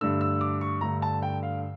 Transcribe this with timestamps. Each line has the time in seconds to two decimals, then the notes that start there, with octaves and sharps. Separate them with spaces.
0.01 G2 D3 A3 E6
0.21 E6
0.41 D6
0.61 C#6
0.81 G2 D3 A3 A#5
1.02 A5
1.22 G5
1.43 F5